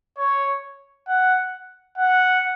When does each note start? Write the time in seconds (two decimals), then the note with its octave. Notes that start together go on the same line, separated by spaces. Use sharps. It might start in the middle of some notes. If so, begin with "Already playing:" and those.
0.18 C#5
1.08 F#5
1.98 F#5